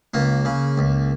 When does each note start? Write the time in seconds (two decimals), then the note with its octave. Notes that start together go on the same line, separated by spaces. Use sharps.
0.14 C#2 A#3
0.45 C#3
0.78 C#2